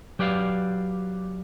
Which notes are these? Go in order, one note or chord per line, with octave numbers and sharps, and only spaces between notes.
F#3 G4 B4 D5 F5